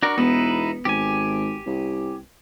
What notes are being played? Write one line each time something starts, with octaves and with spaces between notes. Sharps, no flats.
D4 F#4 A#4
E1 B3 D#4 E4 B4
G#1 G4 G#5
C2